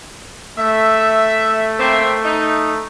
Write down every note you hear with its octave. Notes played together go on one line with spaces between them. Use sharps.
A3 E5
A#3 C4 E5
D#4